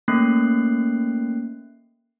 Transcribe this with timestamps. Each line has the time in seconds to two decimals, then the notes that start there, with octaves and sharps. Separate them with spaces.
0.08 A3 A#3 C#4 F#6 C7